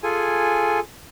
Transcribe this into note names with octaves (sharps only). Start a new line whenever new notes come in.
F4 G#4 A4 G#5